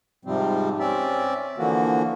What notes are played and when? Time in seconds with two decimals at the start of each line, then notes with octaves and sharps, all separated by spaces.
0.25 G#2 C3 F3 G3 C4
0.79 C4 C#4 D5 E5
1.58 D3 E3 F3 A#3 F#4